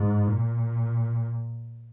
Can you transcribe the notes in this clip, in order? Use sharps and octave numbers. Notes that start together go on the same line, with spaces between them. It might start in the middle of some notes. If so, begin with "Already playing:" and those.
Already playing: G#2
A#2